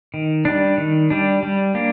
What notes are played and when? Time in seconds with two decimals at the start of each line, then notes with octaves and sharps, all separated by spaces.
0.14 D#3
0.45 G3 D4
0.78 D#3
1.10 G3 D4
1.43 G3
1.75 A#3 D4